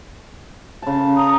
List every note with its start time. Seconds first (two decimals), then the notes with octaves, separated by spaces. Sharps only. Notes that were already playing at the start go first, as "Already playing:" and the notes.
0.82 C#3 A5
1.16 A#5 D#6